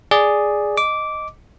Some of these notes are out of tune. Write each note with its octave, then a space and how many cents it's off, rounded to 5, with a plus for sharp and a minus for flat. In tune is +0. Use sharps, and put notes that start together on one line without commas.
G#4 +0 D5 +0
D#5 +0 D6 -10